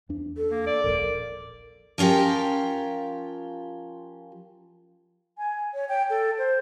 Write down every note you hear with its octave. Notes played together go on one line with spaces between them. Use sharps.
E2 D4
A4
A#3
D5
D#1 A#1 A#4
F3 C#4 F4 G4 A#4
G#5
C#5
G5
A4
C5